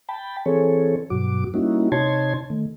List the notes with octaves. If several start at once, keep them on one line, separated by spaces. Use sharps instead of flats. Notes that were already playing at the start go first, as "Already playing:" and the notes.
G5 A5 B5
E3 C4 G#4 A4 C#5
G2 B2 F#3 F#4 D6
G3 A#3 C#4 D#4 E4 F#4
C3 D#4 C#5 A5 C6 G#6
D#3 A3